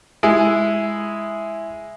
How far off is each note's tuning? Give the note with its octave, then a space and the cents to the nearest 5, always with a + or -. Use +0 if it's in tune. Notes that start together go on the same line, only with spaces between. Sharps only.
G#3 +0 E4 +0